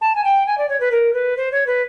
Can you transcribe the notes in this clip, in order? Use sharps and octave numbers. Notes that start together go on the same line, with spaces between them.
A5
G#5
G5
G#5
D5
C#5
B4
A#4
B4
C5
C#5
B4